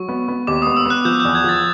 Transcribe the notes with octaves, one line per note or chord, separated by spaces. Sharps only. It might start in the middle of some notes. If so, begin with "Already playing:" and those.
Already playing: F#3 C#6
B3
B3
D#2 D6
B3 D#6
E6
B3 F#6
F3 G6
E2 G6
G#6
F3 A6